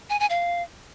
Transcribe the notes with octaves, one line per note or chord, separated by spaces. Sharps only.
G#5
G#5
F5